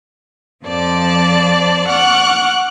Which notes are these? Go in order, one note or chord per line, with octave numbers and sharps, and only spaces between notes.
F2 F3 C5 D5 A5 D6
F#5 C#6 D6 F6 F#6